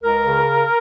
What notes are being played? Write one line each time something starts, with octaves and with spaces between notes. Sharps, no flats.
C#2 A#4
C#3